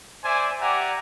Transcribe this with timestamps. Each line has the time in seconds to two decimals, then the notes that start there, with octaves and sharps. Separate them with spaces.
0.23 C5 D5 E5 G#5
0.60 G4 D5 E5 F#5 G#5 A#5